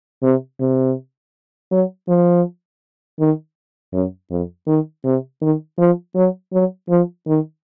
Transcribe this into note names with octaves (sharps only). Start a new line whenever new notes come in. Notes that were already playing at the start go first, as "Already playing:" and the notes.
C3
C3
F#3
F3
D#3
F#2
F2
D#3
C3
D#3
F3
F#3
F#3
F3
D#3